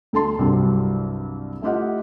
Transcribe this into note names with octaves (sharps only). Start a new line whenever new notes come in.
D2 A4 A5 C6
C2 G2 F#3 G3 C4
A3 E4 F4 G4 D#5 F#5